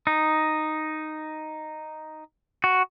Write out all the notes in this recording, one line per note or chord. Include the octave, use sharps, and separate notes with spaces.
D#4
F#4